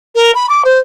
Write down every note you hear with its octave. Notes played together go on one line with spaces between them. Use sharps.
A#4
B5
D6
C5